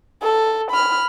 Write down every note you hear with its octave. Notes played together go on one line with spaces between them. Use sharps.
A4
B5 F6